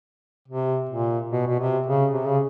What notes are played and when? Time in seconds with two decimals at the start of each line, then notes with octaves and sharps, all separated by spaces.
0.48 C3
0.89 A#2
1.32 B2
1.47 B2
1.59 C3
1.87 C#3
2.14 C3
2.26 C#3